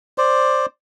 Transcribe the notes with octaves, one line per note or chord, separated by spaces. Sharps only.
C5 D5